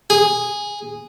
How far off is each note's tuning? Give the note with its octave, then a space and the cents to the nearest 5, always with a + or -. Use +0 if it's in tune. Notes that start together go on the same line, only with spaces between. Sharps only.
G#4 -10